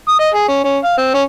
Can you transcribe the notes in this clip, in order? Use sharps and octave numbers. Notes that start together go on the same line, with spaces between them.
D#6
D#5
G#4
C#4
C#4
F5
C4
C#4